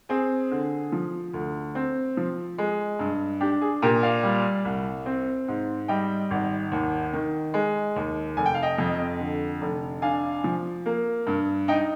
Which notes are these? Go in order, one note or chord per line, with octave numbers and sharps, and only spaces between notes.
C4 G#4
D3
F3
D2
C4
F3
G#3
G2
D4 G4
G#4
A#2 G4 A#4
D5 F5
G3
C2
C4
G#2
G3 D#5 G5
G#1
D#2
D#3
G#3
D#2
F1 G#5
G5
F5
D#5 G5
F2
D3
F1
D4 F5 G#5
F3
A#3
G2
D#4 D#5 G5